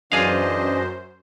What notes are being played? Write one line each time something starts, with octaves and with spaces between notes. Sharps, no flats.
F#2 E3 D4 F4 G#4 C5 D#5 F5